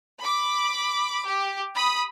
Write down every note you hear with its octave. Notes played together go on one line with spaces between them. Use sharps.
B5 D6
G4
B5 D#6